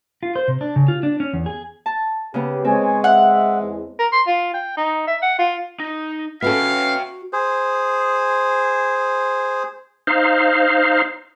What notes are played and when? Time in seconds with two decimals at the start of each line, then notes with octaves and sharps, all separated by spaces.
0.23 F4
0.36 C5
0.48 C3
0.61 D4
0.76 C#3
0.88 F4
1.03 D4
1.20 C#4
1.34 E2
1.46 G#4
1.86 A5
2.34 C#3 B3 G4
2.65 G#3 C4 G#4 C#5 G#5
3.04 E5 F#5
3.60 E2
3.99 A#4
4.12 C6
4.27 F4
4.54 G5
4.77 D#4
5.07 E5
5.22 F#5
5.39 F4
5.80 D#4
6.42 B3 C#4 F#4 A4 E5 F5 G5
7.33 G#4 C5
10.07 D#4 C5 F5